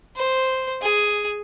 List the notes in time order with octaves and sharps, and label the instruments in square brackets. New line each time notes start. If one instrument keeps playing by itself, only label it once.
[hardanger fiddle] C5
G#4